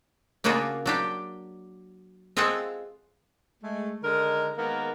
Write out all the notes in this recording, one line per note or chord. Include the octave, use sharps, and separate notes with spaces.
C#3 A#3 C#4 D4 F4 F#4
F#3 D4 G4
G#3 C4 F4 G#4 A4 F#5
G#3 A3
D3 D#3 G#3 A#4
D#3 G#3 A#3 B3 A#4